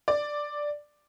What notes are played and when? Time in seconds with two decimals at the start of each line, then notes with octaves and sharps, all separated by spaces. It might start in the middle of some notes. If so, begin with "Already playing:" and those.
0.08 D5